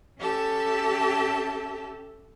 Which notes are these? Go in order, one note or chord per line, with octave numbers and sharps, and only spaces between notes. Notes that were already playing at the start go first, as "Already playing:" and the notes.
C#4 G4 A4 E5 A5